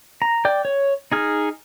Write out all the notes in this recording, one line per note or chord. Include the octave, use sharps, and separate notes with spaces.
A#5
D5 G5
C#5
D#4 G#4 F6